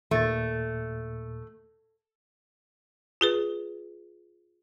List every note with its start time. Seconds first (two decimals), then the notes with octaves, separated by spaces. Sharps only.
0.11 D#2 A#2 A3 A6
3.21 F4 G#4 B4